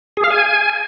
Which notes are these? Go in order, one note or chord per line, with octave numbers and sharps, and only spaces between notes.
G#4
F5
G#5